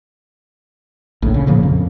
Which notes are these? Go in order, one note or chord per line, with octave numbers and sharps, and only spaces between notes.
A#1 A2
C#3
A#2 C#3 F3 A#3
F2